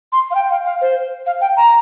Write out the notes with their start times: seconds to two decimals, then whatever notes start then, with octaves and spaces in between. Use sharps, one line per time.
0.12 C6
0.31 F5
0.35 G5
0.50 F5
0.66 F5
0.81 C5
1.26 F5
1.41 G5
1.57 A#5